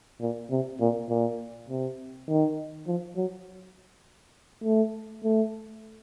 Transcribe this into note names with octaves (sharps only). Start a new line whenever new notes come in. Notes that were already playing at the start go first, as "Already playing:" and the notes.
A#2
C3
A#2
A#2
C3
D#3
F3
F#3
A3
A3